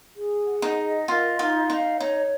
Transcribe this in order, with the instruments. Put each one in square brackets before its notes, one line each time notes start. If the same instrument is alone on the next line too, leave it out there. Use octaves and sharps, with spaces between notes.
[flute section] G#4
F#5
[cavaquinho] D#4
[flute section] D#5
[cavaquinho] F4 [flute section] A#4
[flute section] D#4 [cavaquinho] F4
[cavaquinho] D#4 [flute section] F5
[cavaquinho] D#4 [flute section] C#5